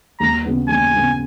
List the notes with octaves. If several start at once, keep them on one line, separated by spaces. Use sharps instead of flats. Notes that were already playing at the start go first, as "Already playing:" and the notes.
D#2 A#5
C#3 F#3 B3
D#2 G#5
C#3 F#3 B3